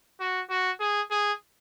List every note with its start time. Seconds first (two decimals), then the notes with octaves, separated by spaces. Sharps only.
0.20 F#4
0.50 F#4
0.80 G#4
1.11 G#4